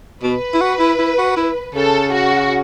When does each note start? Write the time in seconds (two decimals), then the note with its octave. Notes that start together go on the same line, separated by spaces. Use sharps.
0.23 B2 B4
0.54 E4
0.61 F#4
0.80 E4
0.99 E4
1.18 F#4
1.37 E4
1.75 C#3 A4
2.13 F#4